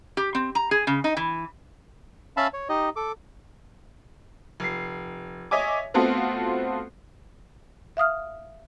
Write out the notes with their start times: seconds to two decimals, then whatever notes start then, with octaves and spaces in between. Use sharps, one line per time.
0.17 G4
0.35 C4
0.55 A#5
0.71 G#4
0.87 C#3
1.04 D#4
1.17 E3
2.37 C#4 E5 F5 A5 B5
2.53 C#5
2.69 D#4 G4 D#5
2.96 A4 D6
4.60 F1 C7
5.51 C#5 D#5 E5 G#5 D6
5.94 A3 B3 C4 F4 F#4 A4
7.97 E5 F5 D#6 F6